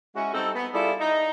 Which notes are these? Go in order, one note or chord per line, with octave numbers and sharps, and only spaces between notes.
G#3 C#4 E4 F#4
G3 C4 D#4 A4
B3
G3 E4 F4 G#4 A4 D5
D#4